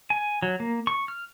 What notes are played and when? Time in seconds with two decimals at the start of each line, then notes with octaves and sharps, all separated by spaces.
0.10 G#5
0.42 F#3
0.60 A#3
0.87 C#6
1.08 F6